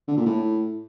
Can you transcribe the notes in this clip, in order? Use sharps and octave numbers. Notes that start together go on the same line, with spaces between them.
D3
A#2
A2